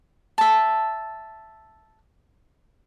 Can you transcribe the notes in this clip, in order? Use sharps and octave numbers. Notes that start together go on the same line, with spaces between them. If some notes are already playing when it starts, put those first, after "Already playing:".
E5 A5